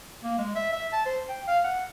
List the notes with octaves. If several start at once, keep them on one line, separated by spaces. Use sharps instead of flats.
A#3
G#3
E5
E5
A5
C5
G5
F5
F#5